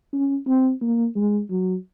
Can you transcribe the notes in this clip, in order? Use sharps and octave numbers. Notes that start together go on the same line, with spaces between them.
C#4
C4
A#3
G#3
F#3